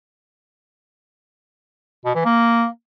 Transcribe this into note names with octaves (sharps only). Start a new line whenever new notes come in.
B2
E3
A#3